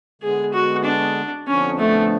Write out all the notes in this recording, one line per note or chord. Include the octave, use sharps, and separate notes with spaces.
D3 G#3 B3 G#4
F#4
D4
F2 D3 F3 B3 C#4 D4
A3